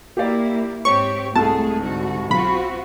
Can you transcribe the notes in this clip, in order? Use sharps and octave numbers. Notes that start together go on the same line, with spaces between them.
A#3 E4 G4 D5
G#2 C4 G4 C#5 C#6
C2 G#3 A3 G#4 A4 A5
G#2 D3 F#4
B1 C4 F4 F#4 B5